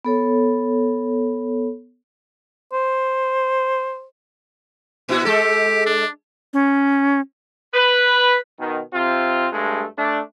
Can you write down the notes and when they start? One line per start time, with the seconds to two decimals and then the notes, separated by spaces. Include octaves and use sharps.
0.05 B3 A4 C#5
2.73 C5
5.09 A#2 E4 F#4
5.25 G#3 G4 A4
5.86 D4
6.53 C#4
7.74 B4
8.60 B2 D#3
8.94 C3 C4 F4
9.53 G2 G#3 A3
9.98 A3 D4